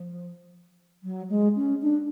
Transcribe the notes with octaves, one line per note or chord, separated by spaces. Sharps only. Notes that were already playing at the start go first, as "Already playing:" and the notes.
Already playing: F3
F#3
G#3
C#4
D4